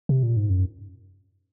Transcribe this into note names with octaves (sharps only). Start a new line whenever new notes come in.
C3
A#2
G#2
F#2